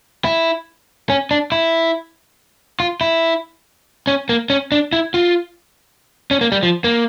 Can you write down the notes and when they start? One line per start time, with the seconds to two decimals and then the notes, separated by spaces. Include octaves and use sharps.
0.24 E4
1.10 C#4
1.31 D4
1.52 E4
2.80 F4
3.01 E4
4.07 C#4
4.29 A#3
4.50 C#4
4.72 D4
4.93 E4
5.14 F4
6.31 C#4
6.41 A#3
6.52 G3
6.63 F3
6.84 A#3